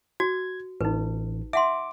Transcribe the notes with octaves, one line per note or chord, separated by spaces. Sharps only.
F#4 G#6
A1 D#4 B4
E5 F#5 C6 D6